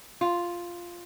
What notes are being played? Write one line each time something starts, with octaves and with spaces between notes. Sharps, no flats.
F4